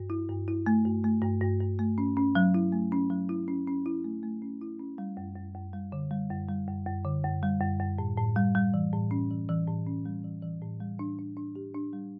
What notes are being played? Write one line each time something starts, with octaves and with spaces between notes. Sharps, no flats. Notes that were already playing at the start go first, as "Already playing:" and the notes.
Already playing: G2
E4
G2
E4
A3
G2
A3
G2
G2
G2
A3
C#4
C#4
F#3
E4
A3
C#4
F#3
E4
C#4
C#4
E4
A3
A3
C#4
E4
C#4
G3
F#2
F#2
F#2
G3
D3
G3
F#2
G3
F#2
F#2
D3
F#2
G3
F#2
F#2
A2
A2
G3
G3
E3
A2
C#4
E3
E3
A2
C#4
G3
E3
E3
A2
G3
D4
D4
D4
G4
D4
G3